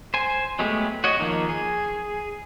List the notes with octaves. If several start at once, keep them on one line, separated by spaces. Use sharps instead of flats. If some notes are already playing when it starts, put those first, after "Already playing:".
C5 G#5
F#3 G#3 A3 B3 G4
F#4 C#5 D#5
D#3 F3 A#3 D#4
G#4